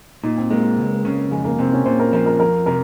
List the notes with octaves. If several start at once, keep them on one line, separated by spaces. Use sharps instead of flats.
A#2 D#4
C4
G#3 A#3
C#2
C#3
F2 G#3
A#3
C3 C4
C#4
A#2 C5
A#4
F3 A#4
A#4
F2 A#4
C3 A#4